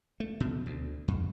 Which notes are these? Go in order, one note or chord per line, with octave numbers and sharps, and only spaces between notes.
A3
B2
D2
F2